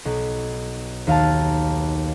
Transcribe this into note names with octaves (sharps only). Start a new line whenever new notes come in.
B1
D#2 F5 A5